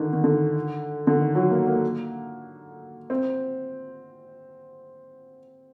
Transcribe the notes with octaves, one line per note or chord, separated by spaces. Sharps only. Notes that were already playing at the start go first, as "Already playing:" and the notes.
Already playing: D3 D#3
D#3
D3
D3
D#3
F#3
A#3
A#3
C4